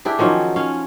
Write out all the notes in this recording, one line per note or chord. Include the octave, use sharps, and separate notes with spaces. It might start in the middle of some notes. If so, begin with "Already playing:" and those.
D4 E4 G4 G#4
D#3 F3 F#3 C#4
C#4 F5